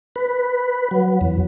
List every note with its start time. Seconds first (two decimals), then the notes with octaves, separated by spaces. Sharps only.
0.16 B4
0.91 F#3
1.21 E2